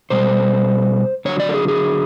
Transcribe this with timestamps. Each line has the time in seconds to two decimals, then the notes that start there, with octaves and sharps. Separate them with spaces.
0.10 B2 G3 C5
1.25 D3 F#3 C#5
1.40 D5
1.49 A4
1.54 G#4
1.68 G#4